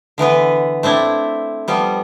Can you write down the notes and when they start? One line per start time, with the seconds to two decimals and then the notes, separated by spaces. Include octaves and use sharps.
0.18 D3 E3 B3 B4
0.83 A3 C4 D4 E4
1.68 F3 G3 B3